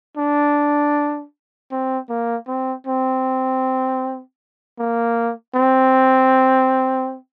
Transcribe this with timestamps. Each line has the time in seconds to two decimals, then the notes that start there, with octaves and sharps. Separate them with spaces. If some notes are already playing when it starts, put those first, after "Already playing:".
0.18 D4
1.72 C4
2.09 A#3
2.47 C4
2.87 C4
4.79 A#3
5.56 C4